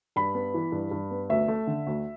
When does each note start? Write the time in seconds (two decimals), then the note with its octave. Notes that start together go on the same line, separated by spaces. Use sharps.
0.16 G2 B5
0.35 B3
0.54 E3
0.72 G2
0.91 G2
1.11 B3
1.29 D2 E5
1.48 A3
1.67 D3
1.87 D2